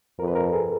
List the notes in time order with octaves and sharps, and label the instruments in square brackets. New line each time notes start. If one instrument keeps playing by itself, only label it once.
[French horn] F2 [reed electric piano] A#4
[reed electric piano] B4
A#4
A4
G#4